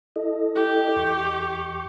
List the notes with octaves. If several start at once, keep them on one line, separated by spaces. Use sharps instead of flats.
E4 A4 D#5
G4
E2 C#6